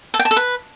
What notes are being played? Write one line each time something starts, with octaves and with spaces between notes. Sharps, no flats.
A4
G5
A5
A4
B4